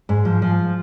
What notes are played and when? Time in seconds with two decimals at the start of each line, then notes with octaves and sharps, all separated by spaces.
0.09 G#2
0.25 F3
0.42 F3